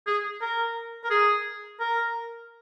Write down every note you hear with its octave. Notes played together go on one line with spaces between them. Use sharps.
G#4
A#4
A#4
G#4
A#4